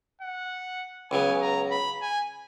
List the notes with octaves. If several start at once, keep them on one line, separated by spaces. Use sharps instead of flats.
F#5
C#2 C#3 F#3 B3 G#5
A#5
B5
G#5